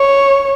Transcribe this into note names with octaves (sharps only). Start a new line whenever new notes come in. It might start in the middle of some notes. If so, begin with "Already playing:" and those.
Already playing: C#5